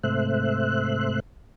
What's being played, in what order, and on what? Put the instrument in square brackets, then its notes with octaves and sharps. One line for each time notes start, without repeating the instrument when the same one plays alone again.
[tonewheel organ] G#2 C3 A3 C5 E5 F#6